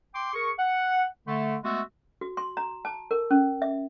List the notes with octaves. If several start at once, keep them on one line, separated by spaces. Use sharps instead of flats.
G5 C6 D6
G#4 A#4 C#6
F#5
D3 A3
G#3 A3 B3 F#4 E5
F#4
C6
A#5
A5
A#4
C#4
E5